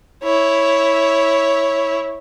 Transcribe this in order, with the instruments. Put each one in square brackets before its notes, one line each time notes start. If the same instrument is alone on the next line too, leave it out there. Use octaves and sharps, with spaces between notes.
[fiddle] E4 C#5